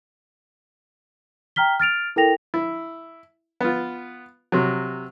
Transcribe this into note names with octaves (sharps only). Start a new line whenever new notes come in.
G5 A#5 F6 B6 G7
F6 A6 D7 F7
E4 A4 A#4 G5 A#6 F7
E4
B3 F4
C3 F#3